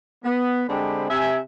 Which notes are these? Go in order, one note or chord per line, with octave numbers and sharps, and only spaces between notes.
B3
D3 G#3 C4 D4 G4 B5
C3 E5 G#5